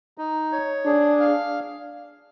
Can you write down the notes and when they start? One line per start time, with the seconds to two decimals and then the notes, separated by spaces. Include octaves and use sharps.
0.18 D#4
0.52 C#5
0.86 D4 G#4
1.20 F5